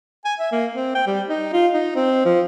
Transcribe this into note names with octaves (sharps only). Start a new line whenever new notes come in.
G#5
E5
A#3
C4
G5
G3
D#4
F4
D#4
C4
F3